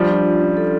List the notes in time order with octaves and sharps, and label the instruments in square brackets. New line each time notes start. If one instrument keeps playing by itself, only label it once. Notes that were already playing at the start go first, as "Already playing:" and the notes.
Already playing: [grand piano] F3 G3 [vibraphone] D4
[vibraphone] F4
D4
C#4
A4